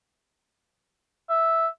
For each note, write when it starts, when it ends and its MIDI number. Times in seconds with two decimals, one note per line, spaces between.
1.29 1.67 76